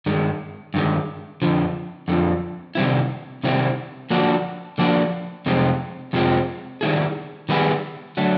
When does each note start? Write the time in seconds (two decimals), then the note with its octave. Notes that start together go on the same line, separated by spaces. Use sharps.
0.06 G2 D#3 G#3
0.74 G2 D#3 G#3
1.42 F2 D3 F3
2.08 F2 D3 F3
2.75 C3 D#3 G3 C4 E4
3.43 C3 D#3 G3 C4 E4
4.10 D3 F3 A#3 D4 F#4
4.78 D3 F3 A#3 D4 F#4
5.46 F2 C3 F3 G#3 C4
6.13 F2 C3 F3 G#3 C4
6.81 D#3 G3 B3 E4 G#4
7.49 D#3 G3 B3 E4 G#4
8.17 D3 F#3 A3